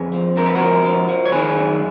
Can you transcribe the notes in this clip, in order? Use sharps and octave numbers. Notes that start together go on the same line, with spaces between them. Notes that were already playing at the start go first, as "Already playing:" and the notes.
Already playing: F2 G#4 B4
F3
F2 A#4
B4
F#4 A#4
F3
F3
F3
C#5
D#3 G#4 B4
F#2